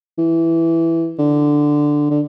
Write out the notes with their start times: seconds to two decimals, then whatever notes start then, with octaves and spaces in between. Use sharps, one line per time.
0.18 E3
1.19 D3
2.11 D3